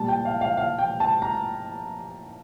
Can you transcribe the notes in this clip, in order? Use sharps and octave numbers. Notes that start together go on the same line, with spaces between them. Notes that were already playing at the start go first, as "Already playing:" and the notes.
Already playing: A#2 G3 A5
G5
F5
F5
F5
G5
A5
A#5